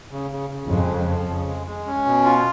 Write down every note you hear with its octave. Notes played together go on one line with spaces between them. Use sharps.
C#3
C#3
C#3
F2 G#3
C#3
F3
C#3
G#3
G#3
C#4
B2
F4